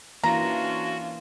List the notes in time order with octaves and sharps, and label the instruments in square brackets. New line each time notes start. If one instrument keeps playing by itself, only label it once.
[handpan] E3 A#3 [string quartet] C#4 D4 F4 [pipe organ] F#4 [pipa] A#5